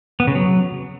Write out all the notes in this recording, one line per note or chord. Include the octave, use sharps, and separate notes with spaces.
B3
C#3
F#3